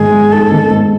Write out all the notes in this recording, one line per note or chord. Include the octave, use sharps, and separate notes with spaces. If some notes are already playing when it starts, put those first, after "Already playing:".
Already playing: G#2 D#3 G#4
G#3
D#4 A4
D#3
G#2